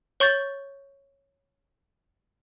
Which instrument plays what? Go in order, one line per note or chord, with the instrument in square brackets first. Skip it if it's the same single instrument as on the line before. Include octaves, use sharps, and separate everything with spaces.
[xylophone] C#5 C#6 G6 A6